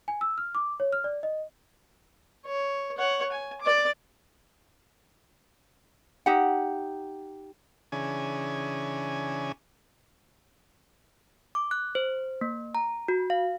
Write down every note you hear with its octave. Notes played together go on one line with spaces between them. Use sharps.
G#5
E6
F6
D6
C#5
F6
D5
D#5
C#5
C#5 F#5
G#5
D5 D6
D#4 G4 F#5
C#3 E3 C#4 D4 G#4 G#5
D6
F#6
C5
A#3
A#5
F#4
F5